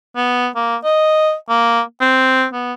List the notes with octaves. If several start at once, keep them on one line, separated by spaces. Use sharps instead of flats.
B3
A#3
D#5
A#3
C4
B3